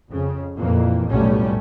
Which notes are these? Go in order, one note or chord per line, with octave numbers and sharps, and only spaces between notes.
F2 C#3
F2 A#2 E3 A#3
B1 F2 A2 G3 A3 C#4